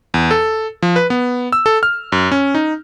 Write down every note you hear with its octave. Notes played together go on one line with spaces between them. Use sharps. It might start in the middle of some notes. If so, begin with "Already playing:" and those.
E2
A4
F3
B4
B3
E6
A4
F6
F#2
C#4
D#4